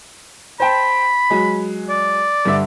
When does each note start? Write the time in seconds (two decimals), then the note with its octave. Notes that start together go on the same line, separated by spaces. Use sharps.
0.60 C5 G5 A5 B5
1.30 F#3 G#3
1.89 D5
2.45 G2 D3 E5